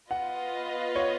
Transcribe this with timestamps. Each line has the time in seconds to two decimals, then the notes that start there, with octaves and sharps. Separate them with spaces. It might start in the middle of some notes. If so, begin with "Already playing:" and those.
0.10 B3 F4 B4 D#5 F#5
0.96 C#5